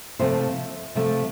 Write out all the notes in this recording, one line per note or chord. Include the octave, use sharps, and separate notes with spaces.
C3 F3 A3 C4 C5
C3 F3 A3 C4